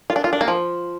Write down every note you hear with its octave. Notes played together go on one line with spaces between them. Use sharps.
F4
D4
F4
D4
A#3
F3